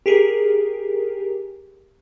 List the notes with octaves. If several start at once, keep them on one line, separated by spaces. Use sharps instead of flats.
G4 G#4 A#4